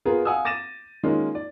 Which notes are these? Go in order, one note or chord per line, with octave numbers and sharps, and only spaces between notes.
B3 F4 G#4 A#4
F5 F#5 G#5 D#6 E6
D6 A6 A#6 D#7 E7
D#3 G#3 A#3 C#4 F4
D5